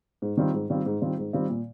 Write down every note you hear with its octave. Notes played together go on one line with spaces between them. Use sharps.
G#2
D#3 G3 C4 F4
G#2
D#3 G3 C4 F4
G#2
D#3 G3 C4 F4
G#2
D#3 G3 C4 F4
A#2